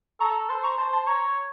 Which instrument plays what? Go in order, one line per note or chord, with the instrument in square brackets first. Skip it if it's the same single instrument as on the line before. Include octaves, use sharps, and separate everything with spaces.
[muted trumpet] A4 [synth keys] A#5 C#6
[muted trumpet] C5 [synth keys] A5 C6
[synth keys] A#5 C#6
[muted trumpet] C5 [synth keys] A5 C6
[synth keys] A5 C6
[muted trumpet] C#5 [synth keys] A#5 C#6